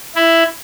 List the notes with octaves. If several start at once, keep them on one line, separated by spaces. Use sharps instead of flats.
E4